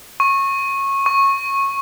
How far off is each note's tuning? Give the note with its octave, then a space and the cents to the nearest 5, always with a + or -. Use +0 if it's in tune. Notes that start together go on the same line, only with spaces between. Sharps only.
C#6 -20
C#6 -15